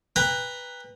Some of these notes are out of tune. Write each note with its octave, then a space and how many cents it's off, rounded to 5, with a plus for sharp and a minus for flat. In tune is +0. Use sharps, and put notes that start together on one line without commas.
B4 +0 G5 +35 A#5 +0